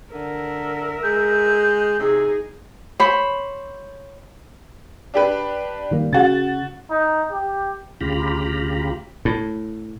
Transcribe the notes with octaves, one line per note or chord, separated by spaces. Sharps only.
D3 A#4 E5
G#3 G6
C3 D#4 G#4
C5 C#5 B5
D4 G4 B4
D#3 G3 A#3
C#3 F#4 A6
D#4
G4
D2 C#3 F4 G4 A#5 B5
A2